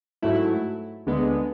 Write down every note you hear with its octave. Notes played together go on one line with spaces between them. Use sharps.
G#2 F#3 A3 E4
D2 D3 G#3 B3